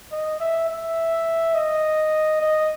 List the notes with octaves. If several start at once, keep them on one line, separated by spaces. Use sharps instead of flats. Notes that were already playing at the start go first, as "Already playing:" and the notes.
D#5
E5
E5
D#5
D#5